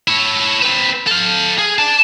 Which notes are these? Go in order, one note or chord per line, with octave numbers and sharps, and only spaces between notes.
E4 C#5
C4 B4
A4 F5
G#4
D5 A5